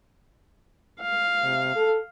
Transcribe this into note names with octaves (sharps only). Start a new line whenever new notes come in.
F5
C3
A4